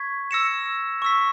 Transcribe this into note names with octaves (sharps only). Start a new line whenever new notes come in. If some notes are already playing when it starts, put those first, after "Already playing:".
Already playing: C#6 G#6 B6
E6 A#6 C#7 E7
C#6 E6 B6